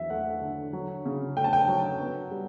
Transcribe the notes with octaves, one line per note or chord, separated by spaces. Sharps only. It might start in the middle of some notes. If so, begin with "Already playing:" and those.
Already playing: E2 F#3 E5
A3 F#5
D3
F#3
C#3
A3 G5
A5
G5
F#3
B3
G3